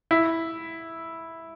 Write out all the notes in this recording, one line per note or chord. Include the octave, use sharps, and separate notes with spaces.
E4